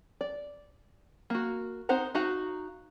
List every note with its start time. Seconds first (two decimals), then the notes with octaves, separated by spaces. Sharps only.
0.21 D5
1.30 A#3 F#4
1.89 C4 D#4 C5 F#5 A#5
2.15 D#4 F#4 F5 A#5